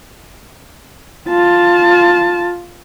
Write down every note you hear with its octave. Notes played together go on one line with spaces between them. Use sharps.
F4 A5